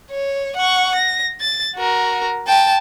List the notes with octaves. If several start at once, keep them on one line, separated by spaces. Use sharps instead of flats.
C#5
F#5 C#6
A#6
A6
F#4 A#4
G5 A5